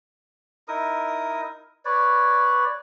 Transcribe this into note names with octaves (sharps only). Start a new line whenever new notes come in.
D#4 E4 A#4 D#6
B4 C#5 D5